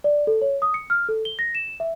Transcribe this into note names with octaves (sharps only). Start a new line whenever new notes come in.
D5
A4
C#5
D#6
C#7
F6
A4
G7
A#6
E7
E5